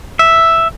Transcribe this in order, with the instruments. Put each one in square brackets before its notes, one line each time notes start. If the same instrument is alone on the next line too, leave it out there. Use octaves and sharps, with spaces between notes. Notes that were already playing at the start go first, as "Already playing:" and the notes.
[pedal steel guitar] E5